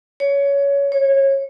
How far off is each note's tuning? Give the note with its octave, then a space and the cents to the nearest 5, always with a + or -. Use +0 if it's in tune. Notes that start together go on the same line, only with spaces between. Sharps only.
C#5 +20
C#5 -25